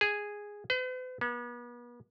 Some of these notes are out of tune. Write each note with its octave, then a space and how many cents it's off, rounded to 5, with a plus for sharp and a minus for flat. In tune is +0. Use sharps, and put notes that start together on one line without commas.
G#4 -5
B4 +45
B3 -40